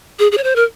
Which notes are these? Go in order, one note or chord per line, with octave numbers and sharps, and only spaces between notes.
G#4
G#4
C#5
C5
A#4